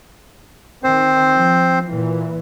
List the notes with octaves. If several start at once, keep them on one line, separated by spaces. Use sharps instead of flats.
D#3 C4 C5
F3
A#2 E3